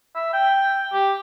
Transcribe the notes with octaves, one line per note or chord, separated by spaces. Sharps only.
E5
G5
G4